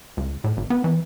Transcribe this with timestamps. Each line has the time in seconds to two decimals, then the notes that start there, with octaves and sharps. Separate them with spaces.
0.17 C#2
0.44 A2
0.57 G#1
0.70 B3
0.84 E3